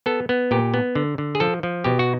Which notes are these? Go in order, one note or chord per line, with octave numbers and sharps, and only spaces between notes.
B3 A4
B3
A#2 G4
B3
D3
D3
G#4
F3 A4
F3
B2 G4
F#4